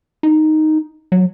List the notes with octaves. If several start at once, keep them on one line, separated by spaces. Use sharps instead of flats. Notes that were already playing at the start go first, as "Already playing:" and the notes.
D#4
F#3